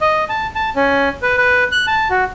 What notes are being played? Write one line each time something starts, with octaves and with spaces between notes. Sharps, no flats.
D#5
A5
A5
C#4
B4
B4
F#6
A5
F#4